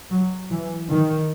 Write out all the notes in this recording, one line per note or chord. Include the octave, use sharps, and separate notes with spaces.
F#3
E3
D#3